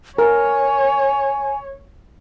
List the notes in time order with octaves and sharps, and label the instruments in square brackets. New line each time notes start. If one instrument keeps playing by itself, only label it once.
[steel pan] A#4 [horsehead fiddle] C#5 [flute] G#5